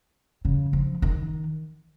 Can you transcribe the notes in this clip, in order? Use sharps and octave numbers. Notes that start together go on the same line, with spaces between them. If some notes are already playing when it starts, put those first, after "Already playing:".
C#3
F3
D#3